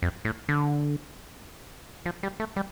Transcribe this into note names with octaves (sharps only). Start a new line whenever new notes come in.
F2
A2
D3
F3
G3
A3
G3